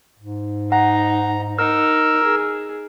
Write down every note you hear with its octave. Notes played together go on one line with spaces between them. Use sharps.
G#2
D#4 F#5 A#5
D#4 A#4 E6 F6
G#4